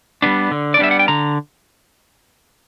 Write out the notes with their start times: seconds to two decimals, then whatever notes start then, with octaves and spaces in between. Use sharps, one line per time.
0.22 G3 B3 D4
0.51 D3
0.74 D5
0.79 G3 B3 D4 E5
0.91 F#5
0.99 G5
1.08 D3 A#5